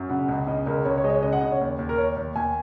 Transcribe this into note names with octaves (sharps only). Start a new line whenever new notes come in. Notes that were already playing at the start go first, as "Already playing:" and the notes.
Already playing: F#2
C#3 F#5
C#2
C#3 D#5
C#2 A#4
C#2 C#5
C#5
G#3 D#5
C#5
C#3 D#5
F#5
C#3 D#5
C#5
D#2
D#2
A#4
D#2 C#5
D#2
D#2 G#5